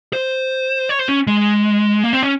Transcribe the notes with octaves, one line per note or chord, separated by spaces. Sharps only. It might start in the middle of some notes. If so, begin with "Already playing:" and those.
C5
C#5
C5
C#4
G#3
A#3
C4
C#4